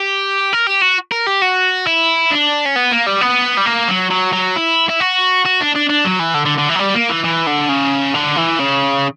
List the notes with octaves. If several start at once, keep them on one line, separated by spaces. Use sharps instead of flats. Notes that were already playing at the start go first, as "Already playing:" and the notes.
Already playing: G4
A#4
G4
F#4
A#4
G4
F#4
E4
D4
C#4
B3
A#3
G3
B3
G3
A#3
F#3
F#3
F#3
E4
E4
F#4
F#4
D4
D4
D4
F#3
E3
D3
D3
D3
E3
F#3
G3
A#3
E3
E3
D3
C#3
D3
E3
C#3